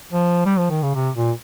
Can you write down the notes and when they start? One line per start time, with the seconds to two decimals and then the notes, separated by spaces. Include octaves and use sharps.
0.13 F3
0.46 G3
0.58 F3
0.70 D#3
0.83 C#3
0.95 C3
1.16 A#2